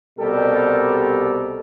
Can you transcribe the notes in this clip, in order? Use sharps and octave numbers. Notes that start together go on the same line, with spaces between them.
C2 B2 G3 G4 A4 A#4